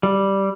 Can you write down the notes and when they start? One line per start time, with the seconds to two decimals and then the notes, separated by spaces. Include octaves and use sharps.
0.03 G3